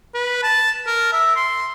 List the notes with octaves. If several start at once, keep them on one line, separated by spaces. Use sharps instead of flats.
B4
A5
A#4
E5
C6